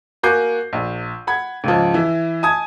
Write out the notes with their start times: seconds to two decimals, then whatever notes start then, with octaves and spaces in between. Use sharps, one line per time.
0.23 A#3 F#4 G#5 D6 G6 C7
0.73 A#1
1.27 F#5 B5 G#6
1.64 C#2 G#2 F3
1.94 E3 E4
2.43 G#5 A5 D#6 G#6